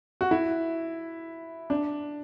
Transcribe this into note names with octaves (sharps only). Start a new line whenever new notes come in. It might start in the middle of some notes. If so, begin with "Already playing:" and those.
F#4
E4
D4